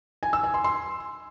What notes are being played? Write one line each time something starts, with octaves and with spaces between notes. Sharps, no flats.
G#5
E6
G#5
C6
C6